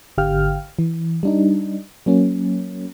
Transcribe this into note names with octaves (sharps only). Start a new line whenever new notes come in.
G#1 D3 G4 F5 G5 F6
E3
G3 D4 D#4
F#3 A#3 C#4